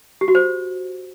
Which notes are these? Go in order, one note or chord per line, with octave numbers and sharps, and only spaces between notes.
G4
F#4
C5